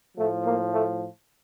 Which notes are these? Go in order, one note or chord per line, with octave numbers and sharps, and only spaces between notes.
A2 F3 A3
A#3
A3